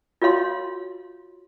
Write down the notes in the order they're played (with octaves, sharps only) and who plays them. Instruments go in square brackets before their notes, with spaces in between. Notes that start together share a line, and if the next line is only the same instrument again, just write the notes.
[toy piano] F4 F#4 C#5 F5 C6